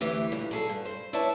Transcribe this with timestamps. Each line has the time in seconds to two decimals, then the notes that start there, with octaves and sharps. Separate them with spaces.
0.01 D2 E3 G4
0.32 G2 A#2
0.51 F#3 G#4 A4
0.69 G2
0.85 C5
1.13 E4 B4 C#5 D5 A5